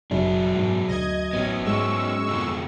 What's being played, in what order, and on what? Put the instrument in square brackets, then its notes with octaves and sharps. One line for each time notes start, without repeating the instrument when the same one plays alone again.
[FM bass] F#1 [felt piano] F#2 [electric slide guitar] B2 D4 G#4
[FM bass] G#2
[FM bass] D2 [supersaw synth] D#5 G#6
[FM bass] A1 [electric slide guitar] B3 C#4
[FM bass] G#2 [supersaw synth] G#3 C#6 E6
[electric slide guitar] F2 B2 D3